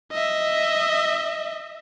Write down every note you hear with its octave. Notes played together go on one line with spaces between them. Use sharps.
D#5 E5